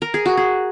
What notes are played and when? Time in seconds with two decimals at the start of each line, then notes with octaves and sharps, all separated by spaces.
0.02 A#4
0.14 G#4
0.26 F#4
0.37 G#4